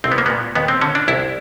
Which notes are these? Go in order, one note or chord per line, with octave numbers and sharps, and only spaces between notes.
C2 C4
B3
A#3
A#2 B3
D#2 B3
C4
D3 C#4
D4
C2 E4